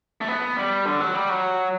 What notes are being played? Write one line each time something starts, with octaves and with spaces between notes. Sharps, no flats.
A3
B3
G3
D3
F#3
G3
F#3